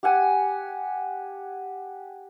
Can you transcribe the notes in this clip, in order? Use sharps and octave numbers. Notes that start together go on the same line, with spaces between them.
G4 F#5 G#5